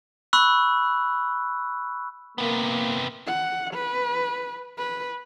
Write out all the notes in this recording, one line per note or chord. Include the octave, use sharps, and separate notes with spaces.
B5 C#6 E6 F#6
C3 A#3 B3
F#5
B4
B4